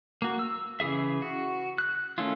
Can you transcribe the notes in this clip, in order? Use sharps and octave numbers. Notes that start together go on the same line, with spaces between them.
A#3 F#4
E6
C#3 E3 G#4 E5
F#4
F#6
D#3 A3 C#4 E4 F4